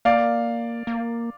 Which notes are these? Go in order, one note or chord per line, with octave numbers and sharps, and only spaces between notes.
A#3 D5 F5
A#3